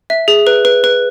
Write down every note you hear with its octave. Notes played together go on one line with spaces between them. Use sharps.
E5
G#4
B4
B4
B4